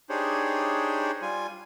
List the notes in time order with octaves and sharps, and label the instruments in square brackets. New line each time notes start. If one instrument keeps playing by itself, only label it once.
[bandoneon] D4 D#4 G4 G#4 C5 C#5
G3 F4 G#5